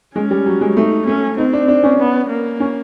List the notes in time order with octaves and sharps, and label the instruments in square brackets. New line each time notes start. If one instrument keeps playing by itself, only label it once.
[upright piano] G#3 [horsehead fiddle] C#4
[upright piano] G3
F#3
G#3
[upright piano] A3 [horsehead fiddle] D#4
[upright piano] A3 [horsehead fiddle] C#4
[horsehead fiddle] C4 [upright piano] D#4
[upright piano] D4
D4
C#4
[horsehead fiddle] B3
A#3
[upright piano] C#4